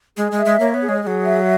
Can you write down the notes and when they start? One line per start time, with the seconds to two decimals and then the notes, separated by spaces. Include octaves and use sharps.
0.17 G#3 G#4
0.32 G#3
0.39 E5
0.45 G#3
0.60 A#3 C#5
0.74 B3
0.81 G#4
0.89 G#3
1.02 G#3 G#4
1.07 F#3
1.24 E5